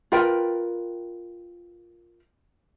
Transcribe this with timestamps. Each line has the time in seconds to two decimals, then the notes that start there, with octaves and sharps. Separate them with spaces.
0.12 F4 A#4 B4 G5